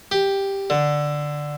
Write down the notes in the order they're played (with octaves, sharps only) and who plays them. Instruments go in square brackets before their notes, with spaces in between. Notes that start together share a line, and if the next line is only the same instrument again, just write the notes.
[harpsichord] G4
D3